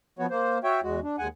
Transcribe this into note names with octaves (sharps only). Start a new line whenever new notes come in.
F3 B3 F#4 C#5
A#3 C5
F#4 C#5 E5 G5
E2 G#3 F#4
D4
D#2 G#3 F#5 G#5